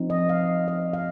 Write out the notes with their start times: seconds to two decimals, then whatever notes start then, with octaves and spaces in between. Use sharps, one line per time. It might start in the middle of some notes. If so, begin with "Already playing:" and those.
Already playing: F3 C4 D#4
0.10 D#5
0.29 F5
0.68 D#5
0.93 F5